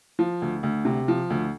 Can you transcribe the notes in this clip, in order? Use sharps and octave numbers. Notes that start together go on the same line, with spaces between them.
F3
D2
D2
C3
F3
D2